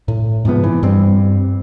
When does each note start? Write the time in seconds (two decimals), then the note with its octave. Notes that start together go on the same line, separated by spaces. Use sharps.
0.08 A2
0.45 G#2 C3 F3 B3
0.64 E3
0.83 G2 G3 C4